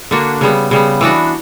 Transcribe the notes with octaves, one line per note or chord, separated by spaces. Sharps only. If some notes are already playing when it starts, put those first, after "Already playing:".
D3 A#3 D4 F#4
C#3 G3 B3
C#3 G3 B3
E3 B3 D4 F#4